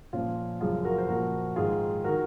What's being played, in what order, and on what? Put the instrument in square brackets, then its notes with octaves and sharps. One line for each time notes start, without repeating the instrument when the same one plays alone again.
[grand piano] A#2 F3 C#4 F4
F#2 C#3 F3 F4 G#4
F#4 A#4
C5
A#2 F3 F#4 A#4
G#2 D#3 F4 G#4
D#3 F#4 A#4